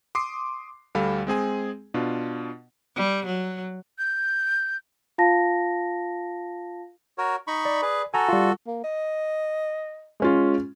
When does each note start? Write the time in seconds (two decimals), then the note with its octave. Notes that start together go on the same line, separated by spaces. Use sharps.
0.15 C6 D6 D#6 C7
0.95 D2 G3 A4 F5 B5
1.27 G#3 C4 G#4 G#5
1.94 B2 D4 F4
2.95 G3
3.26 F#3
3.98 G6
5.18 F4 F5 A5 A#6
7.18 F#4 A#4 C#5
7.47 D#4 B5 C#6
7.65 D5
7.82 G#4 B4
8.14 F#4 A4 G#5 A#5
8.29 G3 F4
8.67 A#3
8.84 D#5
10.20 G#3 C#4 F4